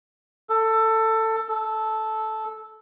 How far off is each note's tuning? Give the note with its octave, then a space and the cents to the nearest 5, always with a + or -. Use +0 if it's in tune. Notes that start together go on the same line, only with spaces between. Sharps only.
A4 +15
A4 -10